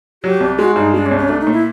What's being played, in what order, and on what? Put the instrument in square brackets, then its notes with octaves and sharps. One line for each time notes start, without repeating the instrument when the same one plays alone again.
[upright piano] F#3 [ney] G4
[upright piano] C2
[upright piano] G#3 [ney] F#4
[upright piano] G2 [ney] D#4
[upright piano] G#3 [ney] D4
[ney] C#4
[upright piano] C2
[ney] C#4
[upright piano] A3 [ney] D4
[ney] D#4
[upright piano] A#2
[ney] E4